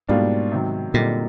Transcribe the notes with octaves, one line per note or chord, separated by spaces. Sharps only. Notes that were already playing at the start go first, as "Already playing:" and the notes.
G#2 B2 G3 A#3 D4 F4
C3 D#3 F#3
F#2 A#2 D3 G3 C4 D#4